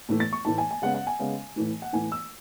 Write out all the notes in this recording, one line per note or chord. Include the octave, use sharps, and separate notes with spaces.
A2 E3 A3
A6
C#6
A2 E3 A3 A5
G#5
G#5
C#3 G#3 B3 F#5
F#5
G#5
C#3 G#3 B3
A2 E3 A3
F#5
A2 E3 A3 G#5
E6